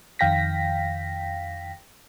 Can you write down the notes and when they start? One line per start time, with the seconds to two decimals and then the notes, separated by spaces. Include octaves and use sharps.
0.19 F2 D#3 F5 G5 A#6 B6